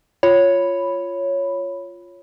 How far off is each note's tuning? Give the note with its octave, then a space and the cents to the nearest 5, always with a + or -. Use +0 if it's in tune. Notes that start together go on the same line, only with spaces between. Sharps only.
F4 +0 C#5 +0 B5 +0